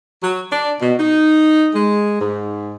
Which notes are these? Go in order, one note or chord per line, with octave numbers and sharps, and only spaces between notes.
F#3
D4
B2
D#4
G#3
G#2